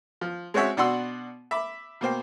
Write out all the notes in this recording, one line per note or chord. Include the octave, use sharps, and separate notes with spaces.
F3
G#3 C4 C#4 F#4 C#5 E5
B2 D4 F#4 F#5 C6 E6
E5 B5 D6
B2 A#3 C5 G5